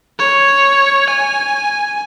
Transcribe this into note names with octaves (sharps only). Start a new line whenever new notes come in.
C#5
G#5